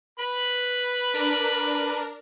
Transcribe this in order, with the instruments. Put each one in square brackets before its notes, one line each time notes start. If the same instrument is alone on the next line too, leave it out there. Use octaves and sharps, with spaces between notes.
[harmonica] B4 B5
[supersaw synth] D4 A#4